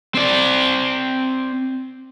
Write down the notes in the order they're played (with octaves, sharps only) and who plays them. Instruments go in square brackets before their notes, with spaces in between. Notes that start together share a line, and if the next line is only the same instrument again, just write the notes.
[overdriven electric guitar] C4 D5